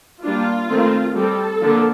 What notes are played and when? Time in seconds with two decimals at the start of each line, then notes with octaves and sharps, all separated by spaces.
0.24 G3 A#3 D4 F4
0.70 D#3 A3 C4
1.16 G3 C4 A4
1.62 D3 F3 A#3 D4